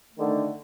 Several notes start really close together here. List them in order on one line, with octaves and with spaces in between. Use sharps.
A3 D#3 D3